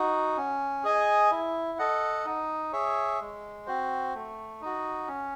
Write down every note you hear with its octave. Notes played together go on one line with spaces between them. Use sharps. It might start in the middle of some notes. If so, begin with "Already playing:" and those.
Already playing: D#4 F#4
C#4
G#4 D#5 G#5
E4
A4 D#5 F#5
D#4
G#4 C#5 E5
G#3
C4 F#4 C5
A3
D#4 F#4
C#4